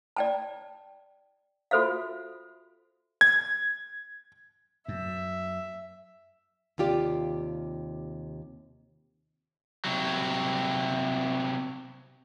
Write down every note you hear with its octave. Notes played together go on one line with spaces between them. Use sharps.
D5 G5 A5
F4 F#4 A4 C5 E5 F5
G#6
F#2 E5
D#2 C3 F4 G4 D5
C3 F#3